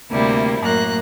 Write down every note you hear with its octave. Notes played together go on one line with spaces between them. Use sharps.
D2 C3 G3 A#3 E4
F#2 A2 A#3 A#5 F#6